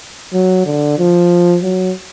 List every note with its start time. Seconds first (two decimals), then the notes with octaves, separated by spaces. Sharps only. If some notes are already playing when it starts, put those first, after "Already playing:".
0.33 F#3
0.66 D3
0.98 F3
1.63 F#3